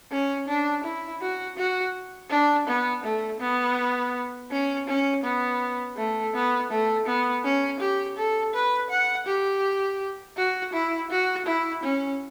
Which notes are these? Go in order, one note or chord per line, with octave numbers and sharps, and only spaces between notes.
C#4
D4
E4
F#4
F#4
D4
B3
A3
B3
C#4
C#4
B3
A3
B3
A3
B3
C#4
G4
A4
B4
F#5
G4
F#4
E4
F#4
E4
C#4